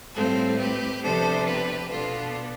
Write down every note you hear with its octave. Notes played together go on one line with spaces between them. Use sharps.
A2 G3 C4 F4 A4
G4 B4
C3 F3 B3 D4 A4 C5
G4 B4
B2 B3 D4 F4 A4